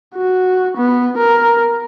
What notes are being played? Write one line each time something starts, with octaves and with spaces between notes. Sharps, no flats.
F#4
B3
A#4